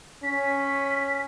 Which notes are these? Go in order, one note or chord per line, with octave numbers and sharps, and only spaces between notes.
C#4 B6